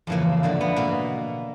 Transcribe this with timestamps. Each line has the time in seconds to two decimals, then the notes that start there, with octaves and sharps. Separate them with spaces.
0.07 F2 C#3 E3 A#3
0.43 F2 D3 A#3
0.61 B3
0.76 B2 A#3